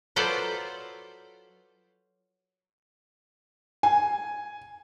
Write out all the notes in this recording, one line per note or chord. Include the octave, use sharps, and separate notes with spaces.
F#3 F4 A4 B4 C5 D5
G#5